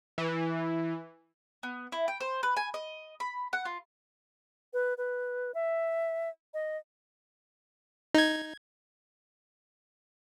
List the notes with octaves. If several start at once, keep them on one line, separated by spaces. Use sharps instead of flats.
E3
B3
E4
G5
C5
B4
G#5
D#5
B5
F#5
F4
B4
B4
E5
D#5
D#4 G#6